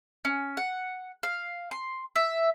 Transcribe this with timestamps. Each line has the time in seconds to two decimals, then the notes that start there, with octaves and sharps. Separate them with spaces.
0.25 C#4
0.57 F#5
1.23 F5
1.71 C6
2.16 E5